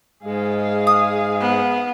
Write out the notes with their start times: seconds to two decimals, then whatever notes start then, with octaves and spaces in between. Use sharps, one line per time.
0.23 G#2 G#3 G#4 F5
0.87 D#6
1.40 B3